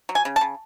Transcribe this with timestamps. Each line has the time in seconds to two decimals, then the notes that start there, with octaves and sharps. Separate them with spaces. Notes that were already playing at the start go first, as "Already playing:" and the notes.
0.09 F#3
0.15 G#5
0.25 C#3
0.36 A5
0.41 C#3